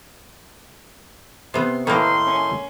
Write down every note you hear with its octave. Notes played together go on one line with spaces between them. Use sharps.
C3 B3 C6
A2 D#3 A#3 A#4 B4 C6
C#4